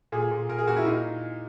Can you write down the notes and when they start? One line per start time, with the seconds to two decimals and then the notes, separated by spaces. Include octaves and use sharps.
0.12 A#2 G#4
0.31 A#2
0.49 A#2 A#4
0.58 G#4
0.67 A#2 F#4
0.77 E4
0.85 A#2 D#4